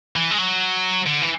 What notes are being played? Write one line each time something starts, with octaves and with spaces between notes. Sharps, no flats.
E3
G#3
F#3
D3
E3